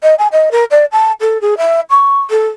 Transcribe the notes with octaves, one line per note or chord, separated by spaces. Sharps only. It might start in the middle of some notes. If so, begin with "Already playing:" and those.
D#5
G#5
D#5
A#4
D5
A5
A4
G#4
E5
C#6
A4